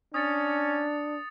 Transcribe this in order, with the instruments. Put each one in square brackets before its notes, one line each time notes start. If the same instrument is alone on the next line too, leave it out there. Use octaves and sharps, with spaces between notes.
[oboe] C#4 [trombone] D4 [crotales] D#6 A6 C#7